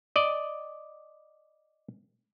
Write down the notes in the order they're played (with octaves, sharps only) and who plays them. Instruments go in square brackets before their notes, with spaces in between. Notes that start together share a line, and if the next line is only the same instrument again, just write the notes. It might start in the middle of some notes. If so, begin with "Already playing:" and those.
[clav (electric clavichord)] D5 D#5